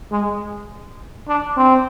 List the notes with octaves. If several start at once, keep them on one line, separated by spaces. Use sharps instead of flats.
G#3
D4
C4